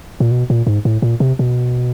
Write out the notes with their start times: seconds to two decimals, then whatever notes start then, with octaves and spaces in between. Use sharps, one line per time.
0.20 A#2
0.31 B2
0.50 A#2
0.67 G#2
0.85 A2
1.02 A#2
1.20 C3
1.39 B2